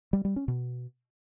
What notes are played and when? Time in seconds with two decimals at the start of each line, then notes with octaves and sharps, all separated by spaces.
0.13 G3
0.25 G3
0.36 C#4
0.48 B2